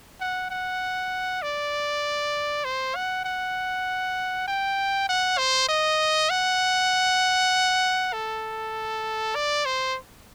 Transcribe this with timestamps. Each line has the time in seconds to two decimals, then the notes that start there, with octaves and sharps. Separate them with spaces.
0.20 F#5
0.50 F#5
1.42 D5
2.64 C5
2.95 F#5
3.24 F#5
4.47 G5
5.08 F#5
5.38 C5
5.68 D#5
6.30 F#5
8.13 A4
9.35 D5
9.65 C5